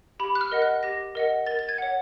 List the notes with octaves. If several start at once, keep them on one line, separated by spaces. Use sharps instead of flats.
G4 B5
F#6
F6
A#4 D#5 F#5
F#6
G4 A#6
A#4 D#5 F#5
A#4 A6
A6
G#6
C#5 F#5